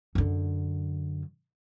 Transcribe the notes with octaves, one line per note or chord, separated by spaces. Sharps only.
F#2 D3